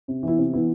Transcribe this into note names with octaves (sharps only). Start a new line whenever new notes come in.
C3
E3 B3 E4
C3
E3 B3 E4